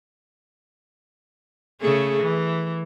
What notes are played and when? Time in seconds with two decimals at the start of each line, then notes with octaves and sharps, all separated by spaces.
1.81 C#3 A3 G#4
2.23 E3